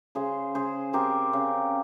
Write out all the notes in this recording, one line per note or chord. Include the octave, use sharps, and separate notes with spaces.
C#3 G#4 C5
C#3 G#4 C5
C4 G4 A#4
C#3